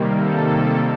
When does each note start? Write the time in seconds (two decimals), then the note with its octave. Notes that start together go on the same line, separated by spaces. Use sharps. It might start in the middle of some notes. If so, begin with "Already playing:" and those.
Already playing: C3 D#3 G3 A#3
0.14 A4